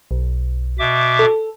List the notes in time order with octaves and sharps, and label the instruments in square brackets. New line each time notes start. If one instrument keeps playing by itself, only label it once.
[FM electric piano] B1
[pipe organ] B2 E5 D6
[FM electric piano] A4